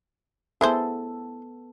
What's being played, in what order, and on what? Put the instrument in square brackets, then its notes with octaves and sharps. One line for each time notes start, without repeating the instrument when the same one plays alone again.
[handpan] B3 A4 [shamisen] E4 G#4 C5